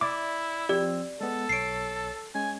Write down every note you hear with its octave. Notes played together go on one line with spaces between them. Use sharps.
E4 D5 E5 D6
F3 C4 G4 D5 E6
G#3 B3 A4
B1 C#5 C7 D7
G#3 C#4 G#5